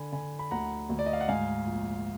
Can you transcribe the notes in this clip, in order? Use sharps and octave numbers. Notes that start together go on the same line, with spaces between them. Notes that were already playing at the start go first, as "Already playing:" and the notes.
Already playing: D3 G#5 B5
D3 G#5 B5
B5
D2 F#5 A#5
D2
D5
D#5
F5
F#5
G#2 F5 G#5
A#1